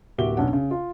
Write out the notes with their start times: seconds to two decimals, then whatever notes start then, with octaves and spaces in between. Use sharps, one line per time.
0.18 D1 A#3 F#4 G4 E5 G7
0.37 B1 C#4 D4 F#5
0.53 C#3
0.71 F4